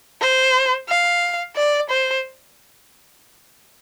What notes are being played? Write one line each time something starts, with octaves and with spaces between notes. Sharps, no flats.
C5
F5
D5
C5